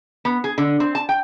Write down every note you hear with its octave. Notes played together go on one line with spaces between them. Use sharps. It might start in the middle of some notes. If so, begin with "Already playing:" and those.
B3
G#4
D3
C4
A5
G5